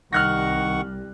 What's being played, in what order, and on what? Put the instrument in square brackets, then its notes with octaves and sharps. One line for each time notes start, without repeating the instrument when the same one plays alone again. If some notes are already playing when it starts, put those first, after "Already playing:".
[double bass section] C2 G3 [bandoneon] D#3 F#5 C#6 [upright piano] F6 F#6 A#6